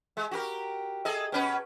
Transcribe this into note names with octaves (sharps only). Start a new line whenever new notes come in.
G#3
F#4 G4 A#4
G#4 A4 D#5
B2 C#4 B4